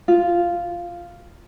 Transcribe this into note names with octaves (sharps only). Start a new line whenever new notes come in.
F4